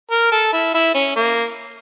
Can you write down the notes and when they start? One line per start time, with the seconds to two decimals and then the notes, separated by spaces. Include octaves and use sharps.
0.11 A#4
0.32 A4
0.53 E4
0.74 E4
0.94 C#4
1.16 A#3